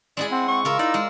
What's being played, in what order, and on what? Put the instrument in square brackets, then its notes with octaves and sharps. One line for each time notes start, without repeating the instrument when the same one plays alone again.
[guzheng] G#3 E4 G#4 [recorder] D5
[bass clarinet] C4 [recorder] F#5
[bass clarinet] C4 [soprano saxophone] C#6
[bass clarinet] C#3 [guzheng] F4 A#4 [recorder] E6
[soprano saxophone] D#4 [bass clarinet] E4 [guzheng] D5
[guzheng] G#3